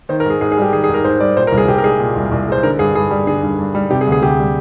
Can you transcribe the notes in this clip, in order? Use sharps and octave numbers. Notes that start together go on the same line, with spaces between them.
D#3 C5
A#4
G#2
G#4
G#2 G#4
G#4
G3 G4
D#3 G#4
G#4
G#2
A#4
G#2 C5
G3 D5
A#2 C5
A#4
C2
G#4
C2 G4
A#4
G#3 G#4
A#2
C2
C2
G#3 C5
D3 A#4
G2 G#4
G2 G#4
G3
D3 G#4
G2
G2
G3
C3 G4
G#4
D2
G#4
D2 G4
G3